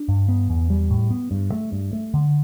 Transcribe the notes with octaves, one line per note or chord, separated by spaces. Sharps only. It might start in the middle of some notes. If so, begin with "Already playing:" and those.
Already playing: D4
G2
B3
E2
G3
A2
B3
G2
A3
G2
A3
D3